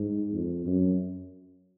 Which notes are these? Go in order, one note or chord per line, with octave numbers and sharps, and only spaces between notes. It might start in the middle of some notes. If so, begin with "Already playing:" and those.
Already playing: G#2
F2
F#2